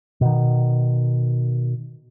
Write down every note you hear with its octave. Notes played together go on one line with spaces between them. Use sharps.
B2 D#3